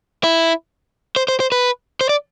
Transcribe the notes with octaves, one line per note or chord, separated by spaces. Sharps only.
E4
C5
C5
C5
B4
C5
D5